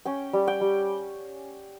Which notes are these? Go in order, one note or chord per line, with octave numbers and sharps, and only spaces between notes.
C#4 G5
G3
G5
G3